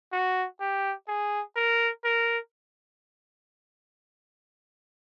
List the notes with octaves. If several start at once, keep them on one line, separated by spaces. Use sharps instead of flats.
F#4
G4
G#4
A#4
A#4